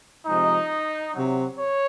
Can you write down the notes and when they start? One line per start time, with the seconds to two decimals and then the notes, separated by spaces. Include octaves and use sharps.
0.26 C3 F3 G#3 D#4
1.14 C3 F#3
1.58 C#5